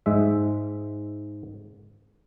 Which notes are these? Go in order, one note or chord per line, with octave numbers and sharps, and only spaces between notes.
G#2 G#3 E5